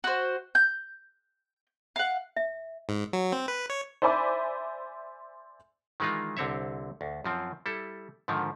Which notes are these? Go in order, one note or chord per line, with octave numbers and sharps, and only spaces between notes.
F#4 C5
G6
F5 F#5
E5
G#2
F#3
C4
B4
C#5
C5 D5 E5 G#5 B5 D6
D#3 E3 G#3 D#4 F4
C2 D3 C4 C#5 E5
D2
F#2 F3 C4
G3 E4 A4
G#2 D3 D#3 F3